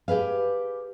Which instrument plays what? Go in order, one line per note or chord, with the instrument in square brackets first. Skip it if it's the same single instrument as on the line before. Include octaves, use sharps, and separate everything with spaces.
[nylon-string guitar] G4 G#4 B4 F5